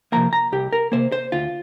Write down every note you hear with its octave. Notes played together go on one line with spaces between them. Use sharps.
C3 F3 A#3 A#5
A#5
C2 G4
A#4
C3 A#3 C5
C5
D2 F4